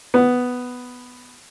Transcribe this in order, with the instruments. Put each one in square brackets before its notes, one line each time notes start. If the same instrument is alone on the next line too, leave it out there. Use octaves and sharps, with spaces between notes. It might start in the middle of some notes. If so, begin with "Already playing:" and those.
[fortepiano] B3